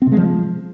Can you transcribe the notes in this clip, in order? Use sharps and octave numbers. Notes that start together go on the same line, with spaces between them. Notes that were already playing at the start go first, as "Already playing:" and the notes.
C4
C3
G#3
F3